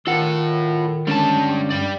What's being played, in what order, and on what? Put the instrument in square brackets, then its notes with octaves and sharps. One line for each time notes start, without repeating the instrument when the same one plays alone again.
[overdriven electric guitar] A2 A4 [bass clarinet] D#3 [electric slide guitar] F4 F#5
[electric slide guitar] D3 G#3 C#4 [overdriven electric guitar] G3 A5
[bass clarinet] G2 [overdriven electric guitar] G4 D5